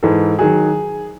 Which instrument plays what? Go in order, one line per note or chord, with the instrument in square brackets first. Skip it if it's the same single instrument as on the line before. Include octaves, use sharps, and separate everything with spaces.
[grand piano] G#2 E3 A4
D#3 F#3 G#4